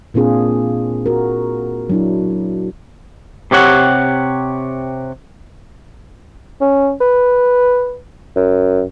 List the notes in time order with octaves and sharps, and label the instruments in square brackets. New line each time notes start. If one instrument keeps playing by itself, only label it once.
[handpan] A#2 A#3 C4 D4 F4 G#4
F#4 A#4
F#3 D4 E4
[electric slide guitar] C3 G4 C#5 F#5
[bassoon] C#4
B4
F#2